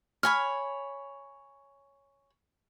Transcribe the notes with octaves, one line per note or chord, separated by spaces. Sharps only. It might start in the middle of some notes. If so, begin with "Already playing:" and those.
C#5 G#5 B5 F6